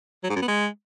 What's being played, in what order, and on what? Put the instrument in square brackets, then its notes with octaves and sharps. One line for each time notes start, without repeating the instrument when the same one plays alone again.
[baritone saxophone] F#3
G#2
F#2
B3
G#3